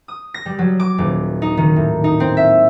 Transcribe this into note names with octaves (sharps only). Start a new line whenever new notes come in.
D#6
A#6
G3
F#3
D6
D#1
D#4
D#3
A2
D#4
C4
E5